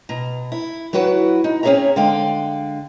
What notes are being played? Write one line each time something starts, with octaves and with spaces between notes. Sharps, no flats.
B2 A#5
E4
F#3 E4 F#4 B4 F#5
D#4
C4 C#4 G#4 C#5 E5 A#5
D3 G#3 F5 G5